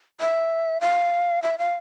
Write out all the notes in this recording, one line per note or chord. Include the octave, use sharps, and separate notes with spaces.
E5
F5
E5
F5